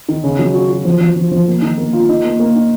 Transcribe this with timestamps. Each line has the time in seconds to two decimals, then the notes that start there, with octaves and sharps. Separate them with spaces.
0.09 D#3
0.24 C#3
0.39 F#3
0.54 F#4
0.69 F#4
0.85 F3
1.01 F3
1.16 F3
1.31 F3
1.48 A#3
1.62 D#3
1.78 A#3
1.93 F4
2.09 D#4
2.24 A#3
2.40 A#3
2.55 D#4